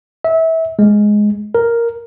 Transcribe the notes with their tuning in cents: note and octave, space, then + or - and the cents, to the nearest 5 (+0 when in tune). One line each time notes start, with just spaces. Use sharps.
E5 -25
G#3 +5
A#4 +0